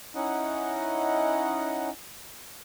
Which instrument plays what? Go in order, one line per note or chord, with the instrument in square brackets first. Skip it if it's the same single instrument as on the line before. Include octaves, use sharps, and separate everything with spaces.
[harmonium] C#4 D#4 E4 D#5 F#5